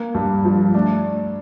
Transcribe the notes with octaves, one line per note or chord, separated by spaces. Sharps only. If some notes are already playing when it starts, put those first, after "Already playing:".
Already playing: A#3
G2
G3
F3
A3 D4